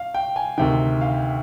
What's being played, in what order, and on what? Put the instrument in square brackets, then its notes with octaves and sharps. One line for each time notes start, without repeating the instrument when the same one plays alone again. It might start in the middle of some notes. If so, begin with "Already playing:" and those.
Already playing: [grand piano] F5
G5
G#5
D2 C3 D#3 G5
F5